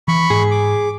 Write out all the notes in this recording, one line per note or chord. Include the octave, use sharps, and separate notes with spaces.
E3 B5 C#6
G#2 G#4
D6